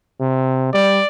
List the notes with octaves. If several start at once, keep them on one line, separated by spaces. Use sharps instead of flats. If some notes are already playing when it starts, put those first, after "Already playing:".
C3
G3 D5